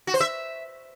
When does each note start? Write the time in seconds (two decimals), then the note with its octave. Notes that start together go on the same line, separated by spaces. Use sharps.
0.07 F#4
0.14 C5
0.20 E5